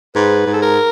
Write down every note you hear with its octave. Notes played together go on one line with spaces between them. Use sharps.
G#2 B4
G#2
A4
A#4